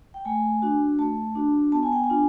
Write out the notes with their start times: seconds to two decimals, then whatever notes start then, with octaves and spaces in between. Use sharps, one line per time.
0.14 G5
0.25 A3 G#5
0.62 D4 F#4
0.99 A3 A5
1.35 D4 F#4
1.72 B3 A5
1.83 G#5
1.93 G5
2.04 G#5
2.10 D4 F4